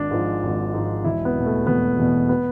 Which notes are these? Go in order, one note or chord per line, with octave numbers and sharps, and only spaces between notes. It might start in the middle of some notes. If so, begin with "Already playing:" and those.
Already playing: G#1 D4
G#2 F3
G#1
G#2 F3
E1 E4
B3
E2 B2
A3
E1 B3
E2 B2
B3